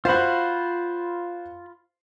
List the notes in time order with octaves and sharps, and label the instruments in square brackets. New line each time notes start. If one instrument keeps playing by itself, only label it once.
[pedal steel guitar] F4 F5 B5 [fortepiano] F#4 C5